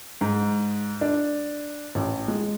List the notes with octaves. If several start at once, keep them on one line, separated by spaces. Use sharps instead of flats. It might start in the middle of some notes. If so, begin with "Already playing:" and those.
G#2
D4
A1
G#3